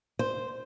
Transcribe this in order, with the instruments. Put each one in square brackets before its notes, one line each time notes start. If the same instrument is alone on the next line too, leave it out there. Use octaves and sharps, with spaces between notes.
[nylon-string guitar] C5